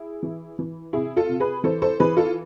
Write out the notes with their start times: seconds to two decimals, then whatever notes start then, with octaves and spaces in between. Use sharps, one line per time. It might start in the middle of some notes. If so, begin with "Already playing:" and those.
Already playing: E4 G#4
0.23 E3
0.59 E3
0.93 C3 E4 G#4
1.16 F4 A4
1.29 C3
1.40 G#4 B4
1.64 E3 A4 C5
1.82 A4 C5
2.00 E3 G#4 B4
2.17 F4 A4